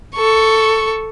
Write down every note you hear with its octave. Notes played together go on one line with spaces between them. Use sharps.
A4 C#6